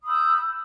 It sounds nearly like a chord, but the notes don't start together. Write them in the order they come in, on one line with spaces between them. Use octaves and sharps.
D#6 B5 E6 G6